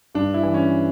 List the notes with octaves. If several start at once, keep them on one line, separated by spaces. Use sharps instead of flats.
G2 D4
E4
E3
C#4